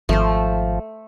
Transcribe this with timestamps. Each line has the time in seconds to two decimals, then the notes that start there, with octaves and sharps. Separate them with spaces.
0.09 G#1 F3 A3 C5